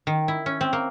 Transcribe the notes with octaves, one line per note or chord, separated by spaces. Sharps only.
D#3
E4
C#4
C4
A#3